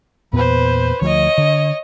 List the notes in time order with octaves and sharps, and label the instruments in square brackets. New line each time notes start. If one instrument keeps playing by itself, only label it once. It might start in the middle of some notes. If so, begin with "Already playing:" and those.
[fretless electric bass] E2 A#2 B3 [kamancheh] B4 C5
[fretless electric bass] D2 F3 [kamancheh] C#5 D#5
[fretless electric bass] D3